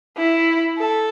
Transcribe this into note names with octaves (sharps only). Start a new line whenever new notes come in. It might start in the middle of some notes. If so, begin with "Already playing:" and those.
E4
A4